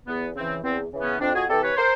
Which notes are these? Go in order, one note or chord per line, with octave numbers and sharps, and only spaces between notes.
E2 B3
C#3 E3 C4
E2 C4
C#3 E3
B3 C#4
F2 C4 D4
F#4 G#4
C3 E3 G4 A4
B4 C#5
A#4 C5